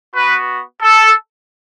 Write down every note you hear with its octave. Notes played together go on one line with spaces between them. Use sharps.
B3 F#4 B4
A4